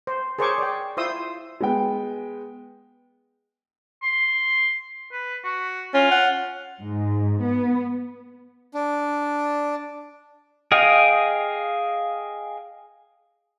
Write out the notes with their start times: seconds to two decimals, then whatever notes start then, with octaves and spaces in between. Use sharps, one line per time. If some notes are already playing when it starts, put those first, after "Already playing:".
0.07 C5
0.39 G#4 A#4 C5 C#5 C#6 D6
0.58 D5 G5
0.97 E4 F4 C5 C6 D#6 E6
1.61 G#3 B3 G5
4.03 C6
5.12 B4
5.44 F#4
5.94 C#4 F4
6.11 F#5
6.81 G#2
7.42 B3
8.74 D4
10.72 G#4 D#5 F5 G5